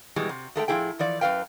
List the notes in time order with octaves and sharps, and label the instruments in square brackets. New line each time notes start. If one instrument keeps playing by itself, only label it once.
[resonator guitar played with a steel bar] B2 E3 G3 G#3
C3
G#3 A3 A4 G5
A2 F3 C4 E4 G#4 G5
E3 F3 D5
F#2 E3 B4 F5 G5